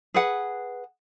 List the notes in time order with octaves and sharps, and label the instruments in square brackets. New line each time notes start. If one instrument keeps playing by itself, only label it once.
[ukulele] G#4 B4 F#5